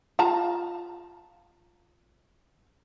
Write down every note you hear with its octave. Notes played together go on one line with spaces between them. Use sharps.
F4 A5 A#5